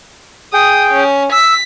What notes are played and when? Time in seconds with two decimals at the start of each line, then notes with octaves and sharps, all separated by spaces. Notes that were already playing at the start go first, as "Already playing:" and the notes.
0.53 G#4 G5 D#6
0.91 C#4
1.32 E6 B6